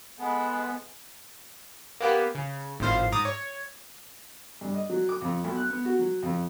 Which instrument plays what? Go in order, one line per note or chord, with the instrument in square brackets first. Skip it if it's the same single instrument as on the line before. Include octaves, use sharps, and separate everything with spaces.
[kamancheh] G#3 A4 [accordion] B3
[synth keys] A#3 B3 G4
C#3
G#1 A2 F3 C5 F5
G#2 A#5 D6 D#6
C#5
[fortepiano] G2
D#5
F#3
D6
F2
B1
F#6
B3
F#4
F#3
F2